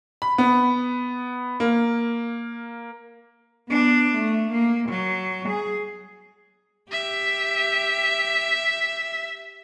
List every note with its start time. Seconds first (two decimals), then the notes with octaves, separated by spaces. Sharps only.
0.22 B5
0.38 B3
1.60 A#3
3.69 B3 D4
4.15 A3
4.52 A#3
4.89 F#3
5.48 G#4
6.92 G4 E5